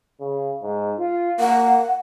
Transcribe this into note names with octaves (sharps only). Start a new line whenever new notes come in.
C#3
G#2
F4
A#3 F#5